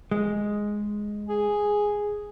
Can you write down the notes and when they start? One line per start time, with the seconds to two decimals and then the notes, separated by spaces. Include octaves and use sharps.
0.11 G#3
1.28 G#4